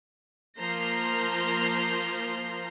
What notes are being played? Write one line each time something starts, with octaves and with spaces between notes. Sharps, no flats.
F3 A#3 C5 A#5 C6